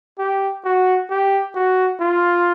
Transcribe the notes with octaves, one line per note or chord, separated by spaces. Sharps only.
G4
F#4
G4
F#4
F4